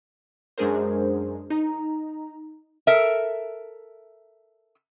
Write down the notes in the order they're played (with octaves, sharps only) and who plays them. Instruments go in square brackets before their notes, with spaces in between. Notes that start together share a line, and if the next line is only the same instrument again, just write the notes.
[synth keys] F#2 G#3 D4 G#4 A#4 C5
D#4 A#5
[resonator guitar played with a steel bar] A4 A#4 E5